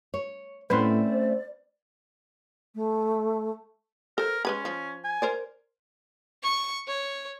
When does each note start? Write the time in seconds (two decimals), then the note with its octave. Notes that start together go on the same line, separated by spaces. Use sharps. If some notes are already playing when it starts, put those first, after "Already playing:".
0.14 C#5
0.70 A2 A3 C4 C#4 B4 D5 C6
1.12 C5
2.75 A3
4.18 A4 A#4 C5
4.45 G#3 C#4 B4 B5
4.65 F3
5.04 G#5
5.22 A#4 C5 D5
6.43 C#6
6.87 C#5